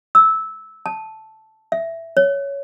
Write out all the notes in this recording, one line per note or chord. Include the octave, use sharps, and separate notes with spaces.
E6
A5
E5
C#5